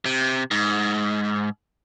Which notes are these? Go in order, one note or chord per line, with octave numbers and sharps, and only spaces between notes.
C3
G#2